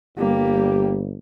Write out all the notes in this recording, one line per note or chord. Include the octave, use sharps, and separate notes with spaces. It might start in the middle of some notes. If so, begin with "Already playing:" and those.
G1 G3 A#3 G4